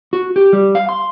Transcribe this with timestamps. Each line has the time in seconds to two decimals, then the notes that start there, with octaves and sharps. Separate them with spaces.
0.13 F#4
0.36 G4
0.53 G3
0.75 F5
0.89 C6